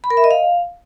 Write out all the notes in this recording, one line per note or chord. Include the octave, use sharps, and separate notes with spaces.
B5
A#4
E5
D#5
F5